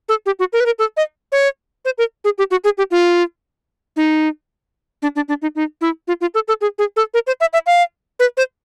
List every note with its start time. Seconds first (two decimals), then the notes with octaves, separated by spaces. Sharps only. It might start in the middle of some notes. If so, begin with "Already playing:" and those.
0.09 A4
0.26 G4
0.39 F#4
0.53 A#4
0.60 B4
0.66 A#4
0.79 A4
0.97 D#5
1.32 C#5
1.85 C5
1.98 A#4
2.24 G#4
2.38 G4
2.51 F#4
2.64 G#4
2.78 G4
2.91 F4
3.96 D#4
5.02 D4
5.16 D4
5.28 D4
5.42 D#4
5.55 D#4
5.81 E4
6.08 F4
6.21 F4
6.34 A4
6.48 A4
6.61 G#4
6.78 G#4
6.96 A4
7.14 A#4
7.27 C5
7.41 E5
7.53 E5
7.67 F5
8.20 B4
8.37 C5